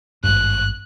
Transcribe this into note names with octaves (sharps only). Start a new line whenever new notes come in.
G#1 G2 F#6